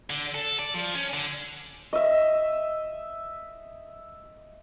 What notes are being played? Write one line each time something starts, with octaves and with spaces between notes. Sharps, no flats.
D3
A4
D5
F3
C#4
D3
D#5 E5